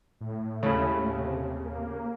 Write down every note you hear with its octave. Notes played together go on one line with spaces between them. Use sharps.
A2
D#2 C#3 A3 E4
C3
A#3